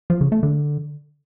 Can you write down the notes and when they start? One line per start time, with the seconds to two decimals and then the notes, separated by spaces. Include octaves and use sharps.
0.10 F3
0.21 C#3
0.32 A3
0.43 D3